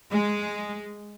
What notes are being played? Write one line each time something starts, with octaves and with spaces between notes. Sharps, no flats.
G#3